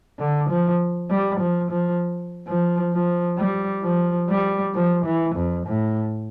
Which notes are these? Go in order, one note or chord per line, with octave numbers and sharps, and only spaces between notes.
D3
F3
G3
F3
F3
F3
F3
G3
F3
G3
F3
E3
F2
A2